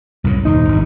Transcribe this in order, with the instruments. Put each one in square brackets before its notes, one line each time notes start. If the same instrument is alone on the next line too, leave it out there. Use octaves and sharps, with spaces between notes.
[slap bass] C2 F#2 A2
[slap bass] D#1 C3 [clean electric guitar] D#4
[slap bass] G#1 G2